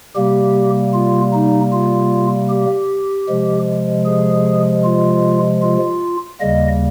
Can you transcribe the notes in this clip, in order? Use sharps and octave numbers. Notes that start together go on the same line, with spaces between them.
C3 G3 A#3 G4
F4
D#4
F4
G4
C3 F3 G#3
G#4
F4
F4
D#2 C#3 G3 A#3 D#5